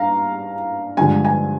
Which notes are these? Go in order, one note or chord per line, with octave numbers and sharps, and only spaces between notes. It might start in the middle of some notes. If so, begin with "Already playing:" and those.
Already playing: G2 F5 A#5
G2 D3 F3 G#3 G#5
G#5